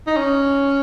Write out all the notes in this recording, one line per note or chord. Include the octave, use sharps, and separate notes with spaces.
D#4
C#4